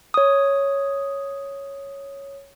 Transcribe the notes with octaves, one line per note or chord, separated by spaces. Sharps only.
C#5 D#6